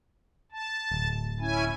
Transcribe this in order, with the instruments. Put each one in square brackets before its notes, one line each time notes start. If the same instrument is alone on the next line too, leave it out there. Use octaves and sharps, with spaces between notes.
[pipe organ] A5
[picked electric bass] D1
[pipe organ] C#4 E4 G#5